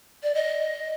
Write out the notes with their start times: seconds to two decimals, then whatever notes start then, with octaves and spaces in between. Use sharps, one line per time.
0.23 D5
0.35 D#5